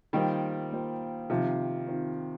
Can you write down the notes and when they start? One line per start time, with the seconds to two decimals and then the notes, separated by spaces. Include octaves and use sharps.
0.13 D#3 G3 A#3 F4 C5
0.72 A#3 F4 C5
1.30 C3 D#3 F3 C4 F4
1.87 D#3 C4 F4